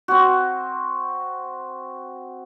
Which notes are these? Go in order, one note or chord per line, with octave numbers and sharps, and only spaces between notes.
C4 F#4